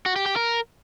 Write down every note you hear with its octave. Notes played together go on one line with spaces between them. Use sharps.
F#4
G4
G4
A#4